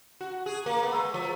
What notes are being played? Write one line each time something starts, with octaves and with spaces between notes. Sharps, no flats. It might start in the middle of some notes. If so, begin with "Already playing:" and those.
F#4
G#4
A#3
B3
G#3
F3